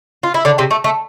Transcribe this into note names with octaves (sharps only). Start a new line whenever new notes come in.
F4
E4
D3 D4
C3 C4
A3
A3